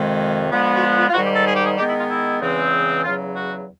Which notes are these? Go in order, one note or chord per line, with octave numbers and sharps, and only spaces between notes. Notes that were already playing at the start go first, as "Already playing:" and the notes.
Already playing: F2 C3 D#3 G#3
D3 F3 G#3 B3
F#4
F4
F4
F4
G#2 D#3 G3 F#4
G4
A4
G#4
G4
G#4
D#3 G#3 B3 G4
E4
F4
E4
E2 C#3 E3 G#3 C4
E2 C#3 F#3 F4
F#4